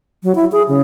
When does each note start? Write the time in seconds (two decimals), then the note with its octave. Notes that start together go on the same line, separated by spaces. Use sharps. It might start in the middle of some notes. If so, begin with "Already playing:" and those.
0.23 F#3
0.35 E4
0.52 G#4
0.68 C#3